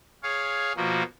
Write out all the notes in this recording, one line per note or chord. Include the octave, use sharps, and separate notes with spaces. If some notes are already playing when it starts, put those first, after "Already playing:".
G#4 C#5 F5
B2 F3 A#3 F#4